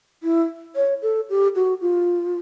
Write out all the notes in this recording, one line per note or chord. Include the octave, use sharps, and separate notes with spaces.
E4
C#5
A4
G4
F#4
F4